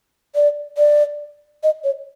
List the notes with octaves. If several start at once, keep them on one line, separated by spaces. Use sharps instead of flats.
D5
D5
D#5
C#5